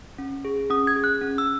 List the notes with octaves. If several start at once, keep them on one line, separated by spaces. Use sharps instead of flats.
C#4
G#4
C#4 D#6
G#6
G#4
F#6
C#4
E6